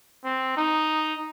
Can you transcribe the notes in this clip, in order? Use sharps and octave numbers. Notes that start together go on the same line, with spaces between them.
C4
D#4